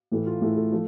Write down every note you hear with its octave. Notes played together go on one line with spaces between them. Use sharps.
A2 E3 A3
F4
A2 E3 A3 G#4
A4
F3 A3